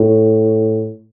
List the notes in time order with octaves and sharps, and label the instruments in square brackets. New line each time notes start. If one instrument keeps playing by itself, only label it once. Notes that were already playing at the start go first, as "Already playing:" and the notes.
Already playing: [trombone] A2